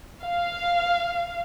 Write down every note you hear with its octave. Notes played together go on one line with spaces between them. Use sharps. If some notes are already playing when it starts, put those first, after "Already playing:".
F5